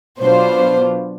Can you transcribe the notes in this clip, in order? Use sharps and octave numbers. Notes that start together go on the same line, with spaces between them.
B2 F#3 B3 D4 F4 C5